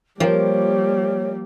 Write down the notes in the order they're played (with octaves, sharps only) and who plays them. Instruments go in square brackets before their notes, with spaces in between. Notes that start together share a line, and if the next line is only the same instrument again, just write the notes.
[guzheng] F3 [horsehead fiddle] G3 A#3 [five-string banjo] F4 G4 A#4 [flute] C#5